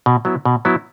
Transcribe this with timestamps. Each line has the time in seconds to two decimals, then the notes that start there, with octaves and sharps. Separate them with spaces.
0.06 B2
0.25 F#3 B3 E4
0.45 B2
0.65 F#3 B3 E4